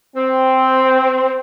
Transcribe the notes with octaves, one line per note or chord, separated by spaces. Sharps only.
C4